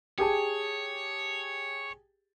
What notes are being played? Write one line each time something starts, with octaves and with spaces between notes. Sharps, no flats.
G4 G#4 C#5 A5